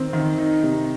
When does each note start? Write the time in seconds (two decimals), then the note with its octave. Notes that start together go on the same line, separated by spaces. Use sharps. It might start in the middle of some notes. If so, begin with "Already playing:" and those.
Already playing: D#3 C4
0.13 D#3
0.38 D#4
0.63 C3